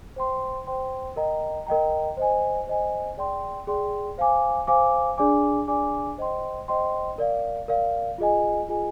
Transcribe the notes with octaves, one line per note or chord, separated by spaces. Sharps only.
C5 G5 C6
C5 G5 C6
A#4 D#5 G5 A#5
A#4 D#5 G5 A#5
C5 D#5 G#5
C5 D#5 G#5
G#4 D5 G5 C6
G#4 D5 G5 C6
C5 F5 G#5 D6
C5 F5 G#5 D6
D4 G#4 D5 G#5 D6
D4 G#4 D5 G#5 D6
C5 D#5 G5 C6
C5 D#5 G5 C6
A#4 D5 F5
A#4 D5 F5
F4 G#4 D#5 G#5
F4 G#4 D#5 G#5